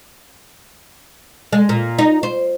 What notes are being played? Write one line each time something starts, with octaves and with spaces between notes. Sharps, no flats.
G#3
A#2
D#4
C5